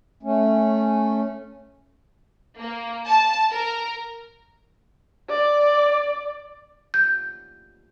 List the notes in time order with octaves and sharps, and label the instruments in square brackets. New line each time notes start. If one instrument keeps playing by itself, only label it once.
[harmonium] A3 C#4
[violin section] A#3
A5
A#4
[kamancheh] D5
[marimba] G6